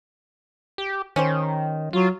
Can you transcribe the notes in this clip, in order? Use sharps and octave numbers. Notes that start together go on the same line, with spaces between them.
G4
D#3 C#4 G4 C5
F#3 F4